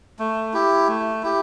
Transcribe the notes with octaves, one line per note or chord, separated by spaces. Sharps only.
A3
E4 G4
A3
E4 G4